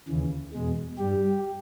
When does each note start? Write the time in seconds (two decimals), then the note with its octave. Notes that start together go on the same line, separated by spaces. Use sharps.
0.08 D#2 C#3 E3
0.53 E2 B2 G#3
0.98 G2 G3 G4